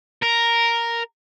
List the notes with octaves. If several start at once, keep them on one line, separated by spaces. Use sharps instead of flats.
A#4